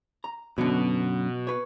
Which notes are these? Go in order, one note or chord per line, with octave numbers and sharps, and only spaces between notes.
A#5
F#2 B2 D3 F#3
B4 C#5